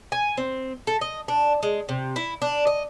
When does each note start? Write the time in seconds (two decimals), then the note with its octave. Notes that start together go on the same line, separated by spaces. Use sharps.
0.12 G#5
0.37 C4
0.87 A4
1.01 D#5
1.28 D4
1.63 G#3
1.89 C3
2.16 E4
2.42 D4
2.67 D#5